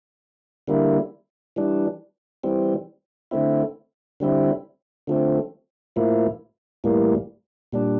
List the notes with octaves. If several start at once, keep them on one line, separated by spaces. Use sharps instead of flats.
D3 G3 A#3 E4
E3 G3 D4
E3 G3 C4
D3 A3 C4 E4
D3 G3 C4 E4
D3 F3 A3 C4
A2 F3 A#3 E4
A2 E3 G3 A#3
A#2 G3 D4